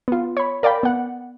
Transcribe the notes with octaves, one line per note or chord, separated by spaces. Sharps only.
B3 F4
C#5 B5
A#4 D5 F5 G5 B5
B3 F#5